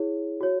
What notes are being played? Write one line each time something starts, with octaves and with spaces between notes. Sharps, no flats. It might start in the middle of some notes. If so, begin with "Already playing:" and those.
Already playing: E4 G#4 C#5
F#4 C#5